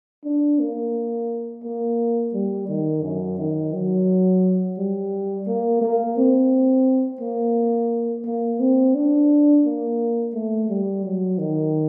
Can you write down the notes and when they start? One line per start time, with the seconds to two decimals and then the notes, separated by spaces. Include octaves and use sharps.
0.25 D4
0.60 A#3
1.64 A#3
2.34 G3
2.69 D#3
3.03 F#2
3.39 D#3
3.73 F#3
4.78 G3
5.47 A#3
5.81 A#3
6.17 C4
7.21 A#3
8.25 A#3
8.60 C4
8.95 D4
9.66 A#3
10.34 A3
10.69 G3
11.05 F#3
11.39 D#3